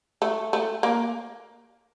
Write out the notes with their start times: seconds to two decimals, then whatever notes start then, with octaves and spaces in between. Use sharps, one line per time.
0.22 A3
0.53 A3
0.83 A#3